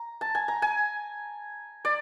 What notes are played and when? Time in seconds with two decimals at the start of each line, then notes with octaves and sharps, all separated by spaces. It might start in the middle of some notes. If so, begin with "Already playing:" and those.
Already playing: A#5
0.21 A5
0.35 G#5
0.48 A#5
0.62 G#5
1.85 D5